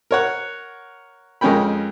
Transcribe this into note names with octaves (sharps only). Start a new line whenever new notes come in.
A#4 C#5 F#5
F2 G#3 C#4 A#4 G5 B5